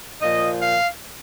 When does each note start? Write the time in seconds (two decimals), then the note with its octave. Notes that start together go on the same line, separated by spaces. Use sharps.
0.22 A#2 F3 D#5
0.62 F5